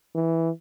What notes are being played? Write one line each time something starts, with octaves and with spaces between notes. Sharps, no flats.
E3